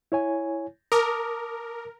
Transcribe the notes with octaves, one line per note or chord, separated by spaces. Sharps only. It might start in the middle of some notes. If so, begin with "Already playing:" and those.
E4 C#5 G#5
A#4 A5 D6 D#6